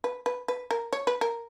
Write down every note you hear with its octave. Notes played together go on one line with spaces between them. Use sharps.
B4
B4
B4
A#4
C#5
B4
A#4